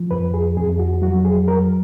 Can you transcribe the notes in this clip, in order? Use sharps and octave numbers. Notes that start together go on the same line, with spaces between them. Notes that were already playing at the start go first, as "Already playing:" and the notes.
Already playing: F3
F2 B4
G#4
F2 G#4
F#4
F#3 F#4
G#4
F#3 A#4